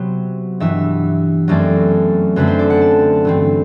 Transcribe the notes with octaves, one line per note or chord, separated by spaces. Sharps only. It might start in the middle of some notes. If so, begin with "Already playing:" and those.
Already playing: C3 F#3 B3 C5
G2 E3 B3 E5
F#2 F#3 A3 C4 D5
F#2 D3 A3 C4 B4
C5
D5
F#5
A5
G2 E3 A3 C4